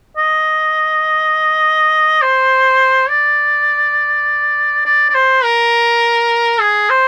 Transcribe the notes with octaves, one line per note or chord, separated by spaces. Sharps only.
D#5
C5
D5
D5
D5
C5
A#4
G#4
C5